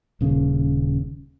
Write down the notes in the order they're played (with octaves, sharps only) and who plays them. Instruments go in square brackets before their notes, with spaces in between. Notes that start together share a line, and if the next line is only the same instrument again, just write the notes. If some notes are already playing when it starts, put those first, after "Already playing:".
[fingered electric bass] D#1 C#3